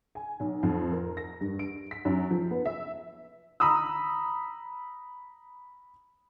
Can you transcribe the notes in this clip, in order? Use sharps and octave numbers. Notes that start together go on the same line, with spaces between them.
G#5
B1
F2
A#4
A#6
G2
D7
B6
F#2
F3
B3
E5
A#5 B5 D#6 E6